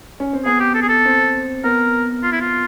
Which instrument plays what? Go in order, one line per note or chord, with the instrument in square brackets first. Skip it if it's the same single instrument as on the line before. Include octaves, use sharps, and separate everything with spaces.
[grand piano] C#4
C4
[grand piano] B3 [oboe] G#4
[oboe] G4
A4
G#4
A4
[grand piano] C4
[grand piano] B3 [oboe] A#4
[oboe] F4
E4
F4